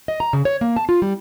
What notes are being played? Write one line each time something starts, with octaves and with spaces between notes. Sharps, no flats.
D#5
A#5
C#3
C#5
A#3
A5
F4
G3